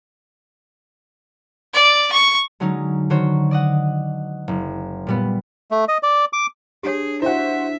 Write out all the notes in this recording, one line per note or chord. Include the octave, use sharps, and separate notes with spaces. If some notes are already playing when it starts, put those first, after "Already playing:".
D5
C#6
D3 F#3 G#3 C#4 D#4
D3 D#3 F#4 C5 C#5
D5 D#5 F#5
F#1
A#2 G3 B3
A3
D#5
D5
D6
D4 G4 G#4 C#5
E4 F#4 C5 E5